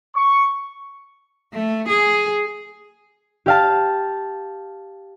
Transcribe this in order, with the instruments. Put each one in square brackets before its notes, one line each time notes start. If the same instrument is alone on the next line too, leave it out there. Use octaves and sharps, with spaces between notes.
[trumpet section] C#6
[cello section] A3
G#4
[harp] G4 F5 A5